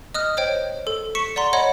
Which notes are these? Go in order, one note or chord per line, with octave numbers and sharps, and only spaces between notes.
D#5 D#6 F6 F#6
C5 C#5 D#5 G5
A4
C#6 B6 C#7 E7
D5 F#5 A#5 C6
C#5 D#5 F#5 B5